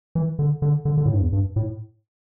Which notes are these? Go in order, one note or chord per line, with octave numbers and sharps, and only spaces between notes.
E3
D3
D3
D3
D3
A2
G2
E2
G2
A2